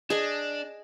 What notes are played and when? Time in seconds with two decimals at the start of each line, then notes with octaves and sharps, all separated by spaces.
0.10 D4 G#4 D#5 G#5